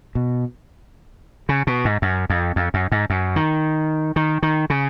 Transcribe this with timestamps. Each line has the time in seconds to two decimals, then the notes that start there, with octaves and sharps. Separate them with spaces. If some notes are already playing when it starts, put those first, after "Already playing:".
0.15 B2
1.49 C#3
1.67 B2
1.85 G#2
2.02 F#2
2.30 F2
2.56 F2
2.74 F#2
2.92 G#2
3.10 F#2
3.36 D#3
4.16 D#3
4.43 D#3
4.70 C#3